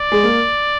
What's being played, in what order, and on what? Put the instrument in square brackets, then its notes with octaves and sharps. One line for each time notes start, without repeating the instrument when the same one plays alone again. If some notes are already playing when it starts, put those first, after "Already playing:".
Already playing: [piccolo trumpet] D5
[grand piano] G#3
A#3